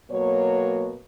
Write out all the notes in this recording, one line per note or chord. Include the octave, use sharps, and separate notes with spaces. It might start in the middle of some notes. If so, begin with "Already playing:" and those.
B2 F#3 A#3 C#5